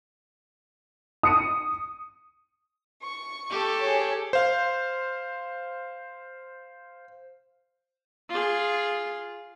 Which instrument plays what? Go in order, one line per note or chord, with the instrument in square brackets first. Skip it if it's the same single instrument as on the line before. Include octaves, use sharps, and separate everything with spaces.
[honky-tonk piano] D#6 C#7 D#7
[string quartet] C#6
[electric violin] G4 A4
[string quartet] G#4 C#5
[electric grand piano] C5 F5
[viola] F4 G#4